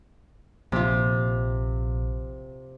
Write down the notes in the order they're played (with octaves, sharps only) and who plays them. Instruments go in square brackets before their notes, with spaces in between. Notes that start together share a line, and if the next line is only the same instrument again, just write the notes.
[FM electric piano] A#1 [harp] C3 F4